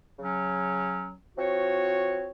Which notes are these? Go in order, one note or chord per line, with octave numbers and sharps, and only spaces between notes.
C#3 F#3 C#4
F3 C4 F#4 C#5